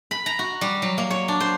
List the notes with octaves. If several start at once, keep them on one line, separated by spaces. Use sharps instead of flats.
B5
A#5
F#4
G3
F#3
A#3
C#5
D4
C5